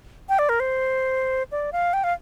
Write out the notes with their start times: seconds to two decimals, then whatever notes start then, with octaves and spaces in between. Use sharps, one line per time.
0.29 G5
0.39 D5
0.49 A#4
0.60 C5
1.52 D5
1.72 F5
1.93 G5
2.04 F5